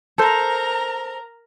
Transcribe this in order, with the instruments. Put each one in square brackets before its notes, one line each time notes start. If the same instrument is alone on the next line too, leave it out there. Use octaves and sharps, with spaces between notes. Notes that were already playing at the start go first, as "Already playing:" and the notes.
[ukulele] A4 C5 [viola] A#4 A#5